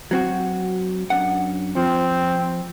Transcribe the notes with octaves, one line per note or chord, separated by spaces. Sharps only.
F#3 C4 F#4
F#2 D4 F#5
F3 C4